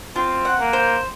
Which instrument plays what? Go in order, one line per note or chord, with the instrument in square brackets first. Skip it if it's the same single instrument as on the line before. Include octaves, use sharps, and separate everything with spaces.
[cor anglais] C4 [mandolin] F4
[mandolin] F#5
[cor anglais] A#3
[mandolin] C5